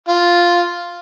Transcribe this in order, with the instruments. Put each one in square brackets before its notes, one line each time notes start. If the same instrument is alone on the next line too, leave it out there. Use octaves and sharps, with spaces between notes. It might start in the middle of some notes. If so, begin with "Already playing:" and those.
[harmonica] F4